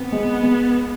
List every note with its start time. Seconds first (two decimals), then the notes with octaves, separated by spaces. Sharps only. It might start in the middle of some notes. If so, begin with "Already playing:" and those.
Already playing: B3 C4
0.12 G#3
0.43 G#3